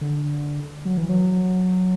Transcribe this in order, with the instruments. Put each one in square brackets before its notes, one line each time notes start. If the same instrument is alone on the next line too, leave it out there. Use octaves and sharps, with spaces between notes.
[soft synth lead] D3
F#3
E3
F#3